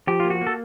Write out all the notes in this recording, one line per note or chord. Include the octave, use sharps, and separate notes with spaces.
F3 G4
A#3 F4
F#4
A#3
A4